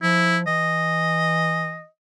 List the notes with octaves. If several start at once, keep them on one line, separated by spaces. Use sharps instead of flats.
F3 E4
E3 D#5